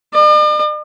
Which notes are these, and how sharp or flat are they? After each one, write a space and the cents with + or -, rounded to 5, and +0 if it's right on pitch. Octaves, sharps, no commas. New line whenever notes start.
D5 +45